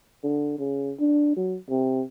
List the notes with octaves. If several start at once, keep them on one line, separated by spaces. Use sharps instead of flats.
D3
C#3
D4
F#3
C3